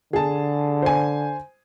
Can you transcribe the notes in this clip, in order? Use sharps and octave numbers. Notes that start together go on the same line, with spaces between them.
D3 G#4 A5
C5 G#5